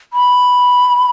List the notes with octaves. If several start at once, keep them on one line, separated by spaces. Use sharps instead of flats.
B5